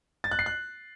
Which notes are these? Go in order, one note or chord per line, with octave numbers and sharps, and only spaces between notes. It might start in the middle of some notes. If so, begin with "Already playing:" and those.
A6
F#6
C7
F#6